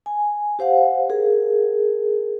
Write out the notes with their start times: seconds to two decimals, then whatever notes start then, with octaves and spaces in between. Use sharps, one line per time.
0.06 G#5
0.59 G4 C5 F5 F#5
1.09 G#4 A#4